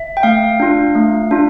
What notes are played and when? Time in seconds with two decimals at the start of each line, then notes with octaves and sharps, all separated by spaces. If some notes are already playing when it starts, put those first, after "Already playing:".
Already playing: E5
0.17 G5
0.23 A3 F5
0.60 D4 F4
0.95 A3
1.31 D4 F4